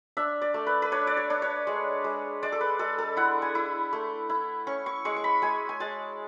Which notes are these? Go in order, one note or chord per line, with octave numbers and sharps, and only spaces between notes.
D4 E5
D5
A3
B4
B4
D4 C#5
D5
C#5
D4
C#5
G#3
G#3
G#3 D5
A4
B4
G#3 A4
A4
E4 F#5
G#5
E4
A3
E4
C#4 C#6
C#6
G#3 C#6
C#6
B5
G#3 G#5
G#5
G#3 A5